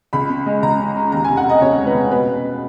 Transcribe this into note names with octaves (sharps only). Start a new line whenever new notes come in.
C#2 B5
C#3
G#3
C#2 A#5
C#4
C#4
D#2 A#5
F1 G#5
F#5
F1 D#5
C#3 C#5
G#3
B4
C#3
B2 B4
B2